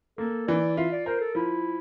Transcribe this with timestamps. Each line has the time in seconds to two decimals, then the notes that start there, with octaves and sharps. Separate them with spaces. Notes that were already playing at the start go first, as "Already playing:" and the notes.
0.18 A#3 A4
0.48 E3 D5
0.77 F4 E5
0.92 D5
1.06 A#4 C5
1.20 A4
1.35 F3 E4